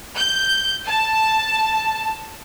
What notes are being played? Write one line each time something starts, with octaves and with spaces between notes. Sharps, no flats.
G6
A5